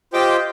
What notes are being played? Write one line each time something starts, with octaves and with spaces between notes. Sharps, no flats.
F4 G4 C5 D#5 G5